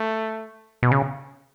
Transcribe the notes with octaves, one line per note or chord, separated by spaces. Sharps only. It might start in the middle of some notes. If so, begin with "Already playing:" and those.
Already playing: A3
B2
C#3